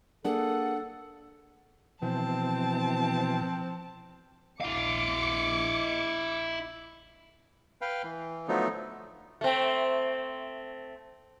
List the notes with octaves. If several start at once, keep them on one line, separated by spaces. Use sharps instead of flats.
A#3 D4 G#4 A4 F#5
B2 E3 F3 C4 A5
A#1 E4 F5 D6 C#7
B4 F5 G5
E3
D3 F3 F#3 A3 B3 D#4
A3 C4